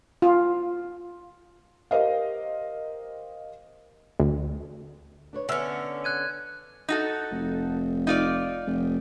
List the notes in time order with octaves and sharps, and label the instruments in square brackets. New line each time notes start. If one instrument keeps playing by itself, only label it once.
[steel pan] F4
[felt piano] G4 A#4 C5 D#5 F5
[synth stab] D2
[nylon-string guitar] D4 B4 C#5
[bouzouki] D3 C#4 [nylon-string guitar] B3 [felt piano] E5 E6 F6
[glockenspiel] F#6 G#6 D#7
[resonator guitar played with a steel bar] D#4 F#4 A4
[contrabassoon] F1
[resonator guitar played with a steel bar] D#4 F4 D5
[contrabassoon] F1